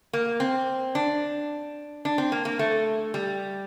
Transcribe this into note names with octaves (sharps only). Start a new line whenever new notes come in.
A#3
C4
D4
D4
C4
A#3
A#3
A3
G3